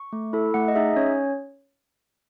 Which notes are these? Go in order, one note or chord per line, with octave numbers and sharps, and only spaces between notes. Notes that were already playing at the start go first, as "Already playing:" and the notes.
Already playing: C#6
A3
E4 A4
A3 F#5
D#5
D#4 G#4 E5
C#4 C#5